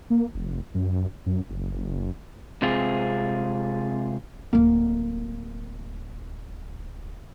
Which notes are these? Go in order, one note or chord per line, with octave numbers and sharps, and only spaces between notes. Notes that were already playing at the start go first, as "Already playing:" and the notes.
A#3
F1
F#2
F#2
F#1
C3 G#3 C4 F4 G#4
D1 A#3